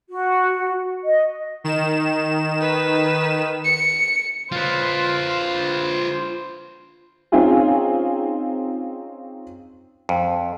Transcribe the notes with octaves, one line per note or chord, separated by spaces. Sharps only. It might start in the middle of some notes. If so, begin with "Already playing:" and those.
F#4
D#5
D#3 E7
B4
C#7
F4 B4 C5
C4 C#4 D#4 F4 G#4
F2